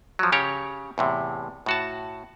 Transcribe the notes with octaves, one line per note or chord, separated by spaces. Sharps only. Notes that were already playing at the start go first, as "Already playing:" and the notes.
F3 F#3
C#3 G4 C#5 A#5
E2 A2 C3
A2 F#4 A5